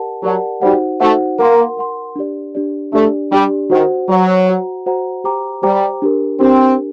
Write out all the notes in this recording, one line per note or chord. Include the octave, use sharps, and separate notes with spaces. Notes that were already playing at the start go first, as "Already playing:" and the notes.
Already playing: G4 A#4 D5 F#5 A5
F#3 G4 A#4 D5 F#5 A5
G3 D#4 F#4 C5 F#5
A3 D#4 F#4 C5 F#5
A#3 A#4 F#5 C6
A#4 F#5 C6
D4 G4 D5
D4 G4 D5
A3 D4 G4 D5
G3 D4 G4 D5
D#3 F#4 C5 F#5
F#3 F#4 C5 F#5
F#4 C5 F#5 A#5
F#4 C5 F#5 A#5
G4 C5 G5 A#5 D6
G3 G4 C5 G5 A#5 D6
D4 G4 A#4
C4 D4 G4 A#4